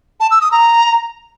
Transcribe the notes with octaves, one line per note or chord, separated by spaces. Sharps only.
A5
E6
D#6
A#5